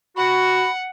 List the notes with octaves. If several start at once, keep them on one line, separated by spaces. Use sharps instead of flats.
F#4 F#5 B5